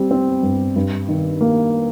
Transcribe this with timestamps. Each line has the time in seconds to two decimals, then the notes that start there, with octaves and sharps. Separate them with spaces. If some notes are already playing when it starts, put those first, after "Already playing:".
Already playing: G3 C4
0.11 C4
0.43 G2
0.76 G2
1.08 D#3
1.41 A#3